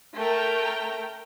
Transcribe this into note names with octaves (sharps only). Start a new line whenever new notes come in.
A3 A#4 G5